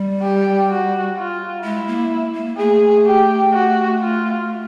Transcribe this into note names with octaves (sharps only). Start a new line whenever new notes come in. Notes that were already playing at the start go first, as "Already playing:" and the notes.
Already playing: G3
G4
F#4
F4
G#3 E4
A#3
A#3
A3 G#4
G4
F#4
F4